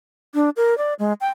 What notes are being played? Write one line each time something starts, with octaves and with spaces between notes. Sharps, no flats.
D4
A#4
D5
G#3
G5